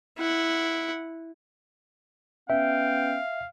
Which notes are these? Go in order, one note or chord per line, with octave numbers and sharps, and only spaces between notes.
E4 F#5
B3 C#4 E5 F5 G5